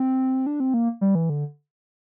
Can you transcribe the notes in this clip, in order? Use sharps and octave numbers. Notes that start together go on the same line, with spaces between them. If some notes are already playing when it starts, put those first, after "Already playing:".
Already playing: C4
D4
C4
A#3
G3
E3
D3